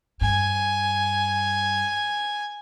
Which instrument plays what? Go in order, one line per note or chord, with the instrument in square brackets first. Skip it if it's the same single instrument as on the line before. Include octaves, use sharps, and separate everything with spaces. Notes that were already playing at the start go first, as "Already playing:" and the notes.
[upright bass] G2 [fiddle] G#5